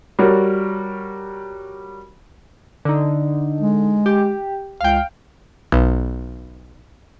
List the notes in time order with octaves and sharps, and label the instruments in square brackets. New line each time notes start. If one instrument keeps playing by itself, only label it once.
[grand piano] G3 F#4 A#4 C#5
[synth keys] D3 D#4
[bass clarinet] G#3
[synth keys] G4
[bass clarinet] C#2 [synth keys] F5 G5
[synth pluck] B1